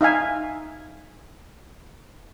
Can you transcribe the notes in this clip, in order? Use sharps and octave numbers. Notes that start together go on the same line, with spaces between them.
D#4 E5 F5 G#5